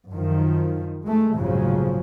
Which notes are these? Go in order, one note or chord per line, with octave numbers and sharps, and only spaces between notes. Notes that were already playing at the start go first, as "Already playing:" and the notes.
F#2 D#3 F3
G#3 A3
F1 A#1 G#2 C#3 F3 F#3